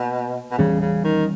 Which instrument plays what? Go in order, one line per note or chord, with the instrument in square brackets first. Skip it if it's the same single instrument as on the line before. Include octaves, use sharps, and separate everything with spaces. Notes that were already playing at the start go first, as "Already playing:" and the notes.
Already playing: [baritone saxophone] B2 [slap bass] A#3
[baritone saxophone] B2
[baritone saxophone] C#3 [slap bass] E3 G3 C#4
[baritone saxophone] C#3
D#3